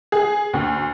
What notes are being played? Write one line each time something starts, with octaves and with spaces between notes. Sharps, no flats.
G#4
D2